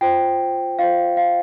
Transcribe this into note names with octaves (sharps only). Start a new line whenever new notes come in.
F4 C5 G5
F4 C5 F5
F5